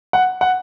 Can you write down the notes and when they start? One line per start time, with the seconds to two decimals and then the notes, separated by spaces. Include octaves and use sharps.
0.13 F#5
0.41 F#5